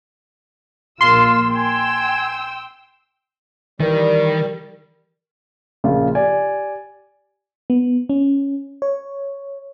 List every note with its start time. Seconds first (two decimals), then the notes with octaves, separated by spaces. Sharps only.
1.01 A#1 A#3 F4 C6 E6
1.56 G5 G#5 E6
3.80 D#3 E3 G3 A#4
5.84 A#1 C#3 A#3 F4
6.15 G4 D5 G#5
7.70 B3
8.09 C#4
8.82 C#5